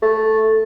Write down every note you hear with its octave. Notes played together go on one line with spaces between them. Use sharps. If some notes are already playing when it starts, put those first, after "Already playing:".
A3